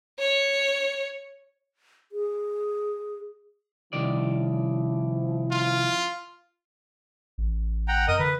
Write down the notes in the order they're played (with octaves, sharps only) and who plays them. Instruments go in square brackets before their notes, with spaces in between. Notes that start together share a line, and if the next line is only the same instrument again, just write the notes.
[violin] C#5
[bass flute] G#4
[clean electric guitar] C2 D#3 D5 [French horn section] F3 C#4 E4
[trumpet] F4
[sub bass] A1
[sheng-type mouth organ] F#5 G5 A#5
[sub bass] F2 [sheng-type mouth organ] A#4 D#5 D#6
[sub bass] D3 [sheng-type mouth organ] B4